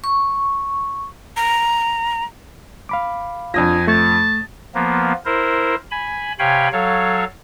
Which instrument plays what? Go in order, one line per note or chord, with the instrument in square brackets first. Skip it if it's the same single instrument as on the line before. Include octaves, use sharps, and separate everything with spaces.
[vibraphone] C#6
[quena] A#5
[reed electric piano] F5 B5 D6
[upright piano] F2 D#6 A#6 [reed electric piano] D4 F4 [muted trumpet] G#5
[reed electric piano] A3 C#6 G#6 [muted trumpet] A5
[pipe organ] F3 A#3 B3
E4 A#4 C5
G#5 B5
C3 C#5 F5 G5 G#5 B5
F#3 A4 C#5 F5